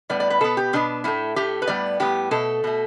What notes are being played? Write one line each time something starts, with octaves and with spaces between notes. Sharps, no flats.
A2 G3 B3 D5
D5
B4
B2 B3 A4
G4
B2 B3 D4
A2 A3 E4
A2 A3 G4
B4
A2 G3 B3 D5
A2 G3 B3 G4
B2 A3 A4
B2 A3